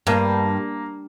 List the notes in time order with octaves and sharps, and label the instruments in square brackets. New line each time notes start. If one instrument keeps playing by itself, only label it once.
[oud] G2 [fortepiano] A#3